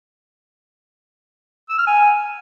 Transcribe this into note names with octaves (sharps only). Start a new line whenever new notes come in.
E6
F6
G#5